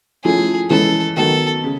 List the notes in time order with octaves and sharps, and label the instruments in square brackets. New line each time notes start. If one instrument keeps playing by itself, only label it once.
[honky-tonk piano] F3 A3 C#4 E4 [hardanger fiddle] G#4
[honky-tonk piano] E3 G#3 C#4 E4 [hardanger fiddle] A4
[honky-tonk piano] D#3 F#3 B3 [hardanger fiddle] A4
[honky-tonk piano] C#3